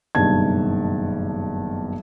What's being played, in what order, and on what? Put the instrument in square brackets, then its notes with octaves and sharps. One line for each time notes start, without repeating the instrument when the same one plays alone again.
[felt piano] F#1 G2 B2 D#3 A5 G#6